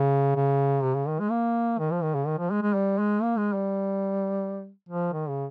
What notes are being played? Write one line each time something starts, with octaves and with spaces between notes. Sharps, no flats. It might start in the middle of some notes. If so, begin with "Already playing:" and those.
Already playing: C#3
C#3
C3
C#3
D#3
G#3
A#3
D#3
F3
D#3
C#3
D#3
F3
G#3
G#3
G3
G#3
A#3
G#3
G3
F3
D#3
C#3